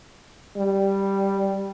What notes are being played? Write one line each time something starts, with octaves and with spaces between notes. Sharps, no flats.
G3